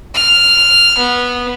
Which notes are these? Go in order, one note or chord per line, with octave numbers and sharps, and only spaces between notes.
F6
B3